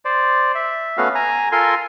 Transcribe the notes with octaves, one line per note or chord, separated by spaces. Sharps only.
C5 D5
E5
A3 B3 C#4 F#4 F5
G#5 A#5
F4 A4 A#4 G#5 C6